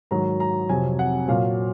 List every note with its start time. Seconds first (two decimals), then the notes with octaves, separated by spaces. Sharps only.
0.11 G#2 D#3 F#3 A#5
0.40 A#5
0.69 F2 C3 F#3 G#5
0.99 F#5
1.28 A#2 F#3 F5